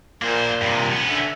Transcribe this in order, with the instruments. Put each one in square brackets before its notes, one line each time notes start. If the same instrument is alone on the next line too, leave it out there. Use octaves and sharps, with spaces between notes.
[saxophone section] A#2 [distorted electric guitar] A#3 C5
[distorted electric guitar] G2 C3
B3 C#4
[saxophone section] D3 E5